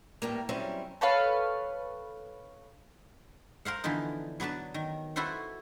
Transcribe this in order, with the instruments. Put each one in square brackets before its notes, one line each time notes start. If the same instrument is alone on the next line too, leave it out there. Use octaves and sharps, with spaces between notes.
[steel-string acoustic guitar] A2 G3 A#3
F#3 G3 C4 C#4 E4
[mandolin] A4 B4 C#5 F5
[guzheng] A#4 C5 F5 F#5
D3 E3 F3 B3 D#4
F#3 B3 D4 B4 A5
D#3
E4 F#4 A4 B4 C5 F#5